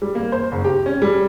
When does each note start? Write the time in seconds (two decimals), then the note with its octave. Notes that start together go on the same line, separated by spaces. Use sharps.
0.02 G3
0.15 A#3
0.32 C5
0.52 F#1
0.64 G4
0.86 C#4
1.02 G3